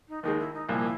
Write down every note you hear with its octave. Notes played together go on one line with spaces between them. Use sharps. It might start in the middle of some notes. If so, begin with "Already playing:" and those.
D#4
D#2 D#3 G#3 D#4
E4
D#4
C2 A#2 F3 A#3 E4